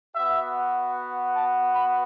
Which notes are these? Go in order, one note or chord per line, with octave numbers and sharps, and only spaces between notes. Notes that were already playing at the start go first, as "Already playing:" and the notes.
B3 F#4 E5
A5
B5